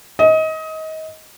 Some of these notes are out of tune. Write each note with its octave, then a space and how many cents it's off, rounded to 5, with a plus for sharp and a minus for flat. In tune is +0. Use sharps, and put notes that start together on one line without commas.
D#5 +25